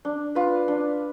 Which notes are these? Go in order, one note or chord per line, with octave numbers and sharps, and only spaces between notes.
D4
F4 B4
D4